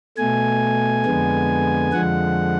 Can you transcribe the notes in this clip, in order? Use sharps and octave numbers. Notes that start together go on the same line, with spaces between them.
B2 A3 G#5
F2 D3 G#3 B3
F2 D3 F3 G#3 F#5